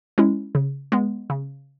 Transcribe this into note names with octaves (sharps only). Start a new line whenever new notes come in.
G#3 C#4 E4
C#3
G#3 B3
C#3